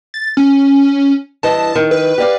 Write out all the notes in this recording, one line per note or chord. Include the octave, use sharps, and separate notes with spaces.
A6
C#4
G2 E3 D#5 A5
D#3
B4
G4 D5 F5